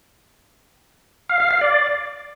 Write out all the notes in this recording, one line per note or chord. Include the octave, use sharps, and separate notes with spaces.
F5
F5
F5
D5